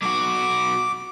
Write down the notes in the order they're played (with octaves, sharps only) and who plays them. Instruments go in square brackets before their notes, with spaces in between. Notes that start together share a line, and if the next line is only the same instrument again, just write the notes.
[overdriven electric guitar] B1 F#4 [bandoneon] D6